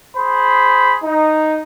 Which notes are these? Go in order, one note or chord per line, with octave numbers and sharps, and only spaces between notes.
G#4 C5 B5
D#4